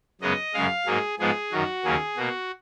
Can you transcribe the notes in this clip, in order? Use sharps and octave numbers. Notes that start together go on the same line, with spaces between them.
F#2 C#3 G#3 B3 D#5
F#2 C#3 G#3 F5
G#2 F#3 A#3 G#4
G#2 F3 G#3 B3 G#4
F#2 D#3 F#3 F#4
D#2 C#3 F#3 A#3 G#4
B2 A#3 F#4